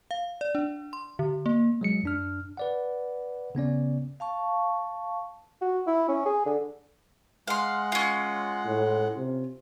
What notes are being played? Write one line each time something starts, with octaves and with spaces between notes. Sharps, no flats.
F5
D5
D4
C6
D3
A#3
F#3 G#3 C#7
F#2 D4 F6
B4 D5 F#5
C#3 B3 C#4 D5
F5 A5 C#6
F#4
E4
C#4
G#4
D3
G#3 F5 F#5 C6
C#4 F4
A2
C3